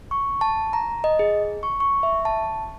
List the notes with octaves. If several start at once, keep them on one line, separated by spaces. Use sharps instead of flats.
C#6
A5
A#5
D#5
G#4
C#6
C#6
E5
A5